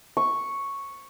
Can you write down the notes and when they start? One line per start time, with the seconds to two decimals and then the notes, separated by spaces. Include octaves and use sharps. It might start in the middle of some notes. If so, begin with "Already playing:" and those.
0.17 C#6